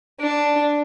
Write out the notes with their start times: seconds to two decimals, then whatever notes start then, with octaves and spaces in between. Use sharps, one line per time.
0.20 D4